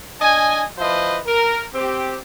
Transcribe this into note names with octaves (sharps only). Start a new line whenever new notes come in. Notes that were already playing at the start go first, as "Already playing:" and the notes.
D4 D#5 G#5
F3 E4 B4 C5 D#5
A#4
C4 G4